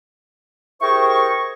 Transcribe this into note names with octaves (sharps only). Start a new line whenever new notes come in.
E4 G4 G#4 A#4 C5 C#6